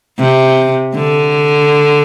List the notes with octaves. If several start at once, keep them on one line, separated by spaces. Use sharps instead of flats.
C3
D3